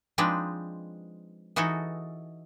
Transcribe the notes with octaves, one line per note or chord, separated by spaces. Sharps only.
F3 G#3 C4 D4 D#4 B4
E3 D#4 F#4 G#4 A4